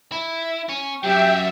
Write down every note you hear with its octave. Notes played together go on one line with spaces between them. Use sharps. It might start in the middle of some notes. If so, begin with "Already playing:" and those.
E4
C#4
F#2 F#3 G4 E5 G5